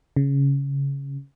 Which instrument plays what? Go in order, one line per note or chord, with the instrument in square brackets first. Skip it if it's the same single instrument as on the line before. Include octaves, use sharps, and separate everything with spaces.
[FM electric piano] C#3